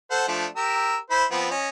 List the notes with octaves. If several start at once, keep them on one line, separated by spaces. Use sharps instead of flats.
A4 C5 F#5
F3 A3 D4
G4 A#4 E6
E4 C5 B5
F3 B3 C4
C#4 D#5